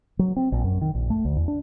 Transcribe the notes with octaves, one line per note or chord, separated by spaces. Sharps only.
F#3
C4
A#1
F#2
D#3
A#1
A3
D2
E2
D4